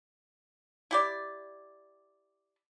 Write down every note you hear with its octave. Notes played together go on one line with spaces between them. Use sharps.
E4 G4 D5